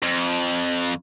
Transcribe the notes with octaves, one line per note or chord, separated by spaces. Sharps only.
F2